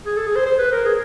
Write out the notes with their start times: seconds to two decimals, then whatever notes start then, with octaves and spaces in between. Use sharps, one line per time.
0.06 G#4
0.17 A4
0.26 G#4
0.35 C5
0.46 C5
0.59 B4
0.72 A#4
0.85 G#4